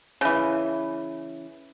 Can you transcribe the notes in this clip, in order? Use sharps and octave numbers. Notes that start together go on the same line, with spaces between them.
C#3 E3